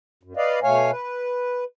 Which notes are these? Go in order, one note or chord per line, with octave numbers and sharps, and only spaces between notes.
F#2
B4 D5 D#5 F5
B2 A3 C#5 F5 G#5
B4